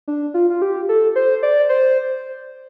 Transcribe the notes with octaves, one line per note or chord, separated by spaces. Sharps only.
D4
F4
F4
G4
A4
C5
D5
C5